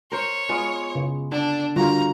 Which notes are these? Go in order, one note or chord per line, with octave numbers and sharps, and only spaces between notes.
A#4 C5 C#5
G#3 B3 F4
C#3
D3 D4
D3 G3 F4 F#4 A#4 A#5